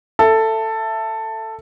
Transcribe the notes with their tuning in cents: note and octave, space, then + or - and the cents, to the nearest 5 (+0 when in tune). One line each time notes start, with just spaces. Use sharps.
A4 +10 E5 +10